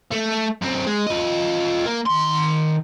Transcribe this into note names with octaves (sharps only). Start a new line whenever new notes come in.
A3
F#2 C4
G#3
F4 D#5
A#3
D#3 C6